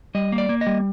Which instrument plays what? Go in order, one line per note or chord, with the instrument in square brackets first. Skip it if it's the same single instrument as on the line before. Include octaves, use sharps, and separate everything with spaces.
[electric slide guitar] G3 D#5
A#3
D5
A#3
D#5
G3